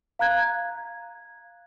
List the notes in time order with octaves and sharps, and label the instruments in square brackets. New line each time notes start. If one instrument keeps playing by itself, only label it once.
[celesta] F5 A#5 F#6 G#6